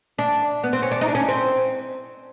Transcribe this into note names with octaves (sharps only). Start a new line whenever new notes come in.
D4
B3
C4
C#4
D4
D#4
D4
C#4
C4